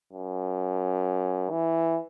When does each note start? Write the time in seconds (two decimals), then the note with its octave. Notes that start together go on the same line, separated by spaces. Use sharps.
0.13 F#2
1.51 E3